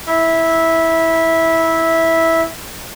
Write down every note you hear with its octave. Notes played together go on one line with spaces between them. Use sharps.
E4 E5